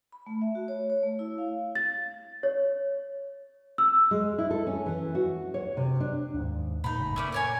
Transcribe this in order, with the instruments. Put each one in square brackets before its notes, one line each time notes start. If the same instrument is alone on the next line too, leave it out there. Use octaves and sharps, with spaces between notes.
[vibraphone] B5
A3
E5
F#4
C#5
C#5
A3
E4
F5
[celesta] A6
C#5
E6
[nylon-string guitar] G#3
E4
A4
C#4
E3
F#4
C#5
C3
D4
[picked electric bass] D#2 G#2
[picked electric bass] A#2 A#3 [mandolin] D#4 B5
[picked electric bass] F#1 A2 C#3
[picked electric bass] A#2 [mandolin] A3 C#4 D5
[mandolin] A#4 C#5 G#5